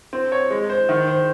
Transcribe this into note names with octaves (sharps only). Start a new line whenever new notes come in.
C4
C#5
G#3
C5
D#3
C5